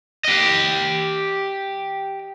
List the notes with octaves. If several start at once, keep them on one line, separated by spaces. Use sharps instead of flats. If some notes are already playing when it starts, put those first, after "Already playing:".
G4 D#5